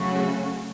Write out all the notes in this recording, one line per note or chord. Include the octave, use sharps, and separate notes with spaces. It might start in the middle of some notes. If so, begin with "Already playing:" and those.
Already playing: C#3 F#3 A3 C#4 F#4